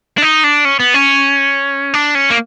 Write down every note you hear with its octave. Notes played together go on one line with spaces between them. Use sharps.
D4
D#4
D4
C#4
B3
C#4
D4
C#4
A#3